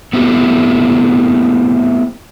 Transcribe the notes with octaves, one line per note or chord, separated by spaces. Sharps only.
A3 B3 C4 E4 F#4 G4